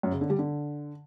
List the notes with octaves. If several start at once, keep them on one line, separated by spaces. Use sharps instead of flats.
F#2
C#3
D3
G3
D3